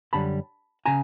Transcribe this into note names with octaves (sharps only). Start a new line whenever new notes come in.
F#2 D3 G3 A5 B5
C#3 G#5 A#5